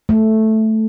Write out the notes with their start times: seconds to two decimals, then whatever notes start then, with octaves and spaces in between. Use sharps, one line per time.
0.09 A3